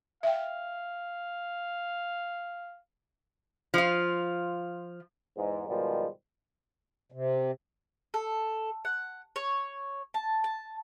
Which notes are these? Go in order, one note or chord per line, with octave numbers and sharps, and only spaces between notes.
E5 F5 G5
F3 F4
E2 G#2
G#2 B2 D#3 F3 G3 G#3
C3
A4
F#5
C#5
A5
A5